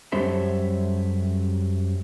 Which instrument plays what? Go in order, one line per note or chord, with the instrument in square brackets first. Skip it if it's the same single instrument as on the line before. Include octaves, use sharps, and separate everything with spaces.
[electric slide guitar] F#2 G3 C#4 A4 C5 E5